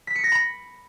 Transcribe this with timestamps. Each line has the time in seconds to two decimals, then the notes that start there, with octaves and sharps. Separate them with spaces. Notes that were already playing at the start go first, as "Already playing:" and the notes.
0.07 B6
0.15 C#7
0.24 A#6
0.32 B5